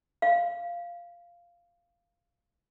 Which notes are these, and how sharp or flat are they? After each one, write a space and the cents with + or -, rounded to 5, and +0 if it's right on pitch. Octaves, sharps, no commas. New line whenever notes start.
F5 -10